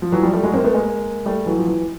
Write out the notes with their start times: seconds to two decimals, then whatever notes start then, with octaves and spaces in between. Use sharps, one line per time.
0.02 F3
0.12 E3 F#3
0.23 F3 G3
0.33 G3 A3
0.43 F#3 G#3
0.54 A#3 C4
0.64 A3 B3
0.74 G#3 A#3
1.26 G3 A3
1.46 E3 F#3
1.58 F3
1.67 E3